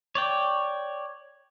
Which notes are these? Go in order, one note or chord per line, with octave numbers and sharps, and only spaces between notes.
C#5 D5 G5